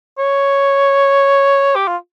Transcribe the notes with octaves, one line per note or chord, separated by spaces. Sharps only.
C#5
G4
F4